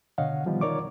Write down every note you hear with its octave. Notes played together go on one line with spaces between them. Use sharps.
B2 D3 C#5 D#5 F5 F#5
D#3 F3 G3 B3
D#4 A#4 C#5 D5 C#6 D6